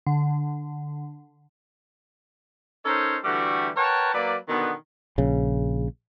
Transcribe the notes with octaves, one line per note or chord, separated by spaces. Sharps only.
D3
C#4 D#4 A4 A#4 C5 C#5
D3 E3 G3 A3 F#4 G4
A#4 B4 C#5 F#5 G5 A5
F#3 A#3 B4 D5
B2 D3 D#3 B3
A#1 C#3